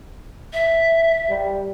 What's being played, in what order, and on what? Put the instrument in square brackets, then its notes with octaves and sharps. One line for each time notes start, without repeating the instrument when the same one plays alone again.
[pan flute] E5
[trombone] G3